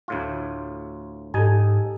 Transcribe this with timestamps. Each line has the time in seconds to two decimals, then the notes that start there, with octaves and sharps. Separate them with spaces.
0.08 D2 A2 F4
1.34 G#2 D#4 G4 A4 G#5